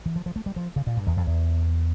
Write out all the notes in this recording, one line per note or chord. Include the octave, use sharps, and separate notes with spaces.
E3
F3
F3
A3
G3
F3
C#3
A#2
G2
E2
F2
E2